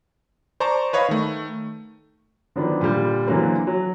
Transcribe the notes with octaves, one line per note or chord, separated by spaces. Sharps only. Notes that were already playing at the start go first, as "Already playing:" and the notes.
C5 D5 A5 A#5 C#6
B4 C#5 D#5 F5 B5
D#3 A3
D3 D#3 F3 F#3 B3 D4
A#2 D3 G3 G6
D3 E3 F#3 A#3 C4
F#3